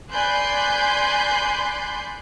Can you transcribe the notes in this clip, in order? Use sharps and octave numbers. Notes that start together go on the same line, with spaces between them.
D5 G#5 B5 C6 F#6 G6